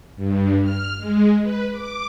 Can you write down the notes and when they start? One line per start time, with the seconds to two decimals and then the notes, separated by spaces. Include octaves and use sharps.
0.16 G2
0.61 F6
0.98 G#3
1.41 B4
1.71 D6